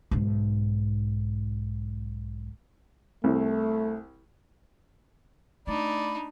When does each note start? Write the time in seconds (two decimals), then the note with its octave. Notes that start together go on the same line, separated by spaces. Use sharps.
0.11 B1 G#2
3.24 C2 A3
5.67 A3 D4 D#4 D5 B5